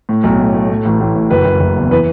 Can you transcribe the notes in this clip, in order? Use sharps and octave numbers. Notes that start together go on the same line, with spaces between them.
A2
B1
A2
A3
A2
A1
A1
A2
F#1 B4
F#1
F#1
E2
E3 B4